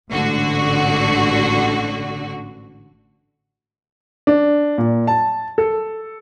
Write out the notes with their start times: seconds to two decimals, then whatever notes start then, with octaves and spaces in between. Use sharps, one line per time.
0.11 A1 G#2 D3 F#4
4.27 D4
4.78 A#2
5.07 A5
5.58 A4